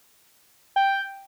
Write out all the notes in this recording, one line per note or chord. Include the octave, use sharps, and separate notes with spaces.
G5